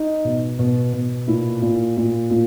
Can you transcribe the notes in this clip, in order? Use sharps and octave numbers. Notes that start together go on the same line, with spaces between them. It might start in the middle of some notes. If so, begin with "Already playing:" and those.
Already playing: D#4
B2
B2
B2
A#2 E4
A#2
A#2
A#2